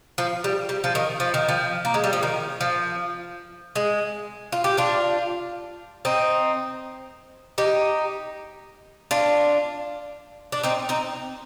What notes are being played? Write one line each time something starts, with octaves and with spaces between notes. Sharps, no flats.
F3
G3
G3
F3
D#3
F3
D#3
F3
A#3
G#3
G3
F3
D#3
F3
G#3
F4
G4
D4 F4
C4 D#4
D#4 G4
D4 F4
D4
C4 D#4
C4 D#4